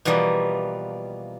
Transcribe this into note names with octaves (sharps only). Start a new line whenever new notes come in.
B2 E3 F3 G3 A#3